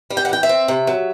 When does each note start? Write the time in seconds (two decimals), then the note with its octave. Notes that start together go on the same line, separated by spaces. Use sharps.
0.10 G3
0.17 G5
0.25 F#5
0.29 E3 G5
0.43 E5
0.49 C4
0.68 C3
0.87 F#3